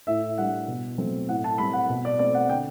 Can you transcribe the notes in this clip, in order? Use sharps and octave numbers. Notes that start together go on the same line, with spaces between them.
A2 E5
G3 D4 F#5
B2
F#3 A3 C4
A2 F#5
A5
G3 C4 B5
F#5
B2
D5
A3 C4 D5
F#5
D3 G5